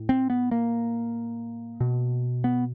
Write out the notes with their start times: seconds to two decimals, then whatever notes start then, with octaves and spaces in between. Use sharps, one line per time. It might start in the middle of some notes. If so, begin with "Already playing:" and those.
Already playing: A2
0.09 C4
0.30 B3
0.51 A#3
1.80 B2
2.44 B3